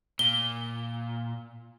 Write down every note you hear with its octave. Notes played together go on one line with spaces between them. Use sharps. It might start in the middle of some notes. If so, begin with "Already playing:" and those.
A#2 G7